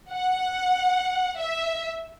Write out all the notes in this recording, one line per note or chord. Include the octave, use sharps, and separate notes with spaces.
F#5
E5